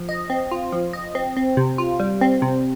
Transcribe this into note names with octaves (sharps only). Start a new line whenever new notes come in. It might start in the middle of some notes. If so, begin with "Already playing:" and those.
Already playing: F3
D#5
C4
F4
F3
D#5
C4
C4
C3
F4
G3
C4
C3